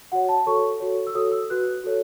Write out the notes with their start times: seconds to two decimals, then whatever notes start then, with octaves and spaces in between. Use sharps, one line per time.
0.12 F#4 C#5 F#5
0.29 A5
0.46 F#4 A4 C#5 C#6
0.80 F#4 A4 C#5
1.07 E6
1.15 F#4 A4 C#5 D#6
1.32 E6
1.50 F#4 B4 F#6
1.84 F#4 A4 C#5